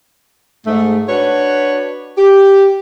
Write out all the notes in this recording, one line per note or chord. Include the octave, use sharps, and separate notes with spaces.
G#2 A3
D4 F#4 B4 C#5
G4